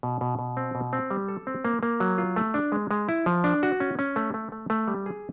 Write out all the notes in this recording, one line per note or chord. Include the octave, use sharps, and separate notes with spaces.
B2
B2
B2
C4
B2
C4
G3
A4
C4
A#3
A#3
F#3
F4
A3
D4
G#3
G#3
E4
F3
D4
F#4
C#4
C#4
A3
A3
A3
A3
G3
G#4